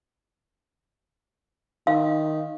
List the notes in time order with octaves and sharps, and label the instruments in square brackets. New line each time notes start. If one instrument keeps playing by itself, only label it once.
[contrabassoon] D#3 [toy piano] F5